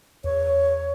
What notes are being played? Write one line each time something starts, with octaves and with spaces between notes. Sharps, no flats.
E2 C#5